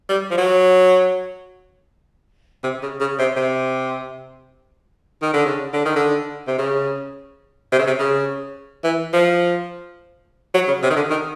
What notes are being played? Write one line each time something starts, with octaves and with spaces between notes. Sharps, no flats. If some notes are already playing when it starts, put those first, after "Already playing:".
G3
F3
F#3
C3
C#3
C#3
C3
C3
D#3
D3
C#3
D3
D#3
D3
C3
C#3
C3
C#3
C3
C#3
E3
F3
F#3
C#3
C3
D#3
D3
D#3